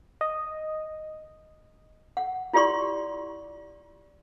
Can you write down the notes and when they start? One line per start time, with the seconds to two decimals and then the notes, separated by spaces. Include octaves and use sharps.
0.21 D#5
2.17 F#5
2.53 E4 F4 G4 D5 C6 C#6